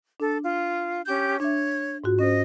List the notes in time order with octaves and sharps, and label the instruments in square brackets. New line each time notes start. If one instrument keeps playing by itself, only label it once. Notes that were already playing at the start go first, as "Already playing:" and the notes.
[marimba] D4 [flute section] A4
[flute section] F4
C#4 G4 G6
[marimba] D4 E5 [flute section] C#5
[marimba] G#2 F4 F#4
[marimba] C#4 C5 [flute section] D#5